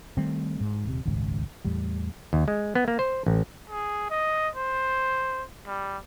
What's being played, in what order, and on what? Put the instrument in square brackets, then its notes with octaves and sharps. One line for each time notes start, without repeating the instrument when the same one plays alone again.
[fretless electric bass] D#3 G3 A3 C4
G#2
D#1 C3
D#1 G#1 C#2 G#2
E2 A2 G3
[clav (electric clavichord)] D#2
G#3
B3
A#3
C5
A1
[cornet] G#4
D#5
C5
G3